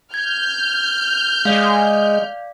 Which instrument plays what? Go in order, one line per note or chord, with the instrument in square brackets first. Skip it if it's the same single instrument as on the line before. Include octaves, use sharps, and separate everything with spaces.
[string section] F6 G6 [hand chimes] G#6
[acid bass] G#3 [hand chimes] D5 F5